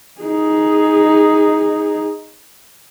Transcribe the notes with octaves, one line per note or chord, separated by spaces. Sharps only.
D#4 G#4